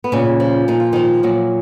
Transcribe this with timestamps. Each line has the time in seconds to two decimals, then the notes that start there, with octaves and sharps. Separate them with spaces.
0.04 B3
0.12 A#2 C#3 C#4
0.40 F3
0.68 A#2 D#4
0.80 F4
0.93 D#3 F3 D#4
1.23 A#2 F#3 F#4